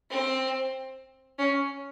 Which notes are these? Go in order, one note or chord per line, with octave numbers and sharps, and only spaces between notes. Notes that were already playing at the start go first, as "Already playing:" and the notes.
C4
C#4